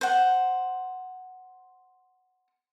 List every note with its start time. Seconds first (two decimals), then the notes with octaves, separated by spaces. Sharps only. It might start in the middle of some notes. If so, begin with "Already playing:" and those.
0.01 C5 F#5